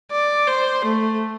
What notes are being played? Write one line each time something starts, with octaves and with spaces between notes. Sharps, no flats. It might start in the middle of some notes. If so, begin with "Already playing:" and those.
D5
C5
A3